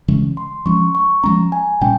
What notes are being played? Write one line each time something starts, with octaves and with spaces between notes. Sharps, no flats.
C#3 E3 G#3 C#4
C6
F3 G#3 C#4 C#6
C#6
F3 G#3 C#4 A#5
G#5
A#2 G3 C#4 G5